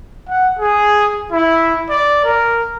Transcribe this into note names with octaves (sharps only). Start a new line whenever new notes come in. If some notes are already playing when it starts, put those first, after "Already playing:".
F#5
G#4
E4
D5
A#4